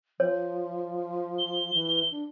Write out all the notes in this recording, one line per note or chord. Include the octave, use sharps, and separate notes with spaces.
F3 C#5
G7
E3
D4